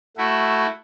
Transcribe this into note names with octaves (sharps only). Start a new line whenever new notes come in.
A3 E4 F#4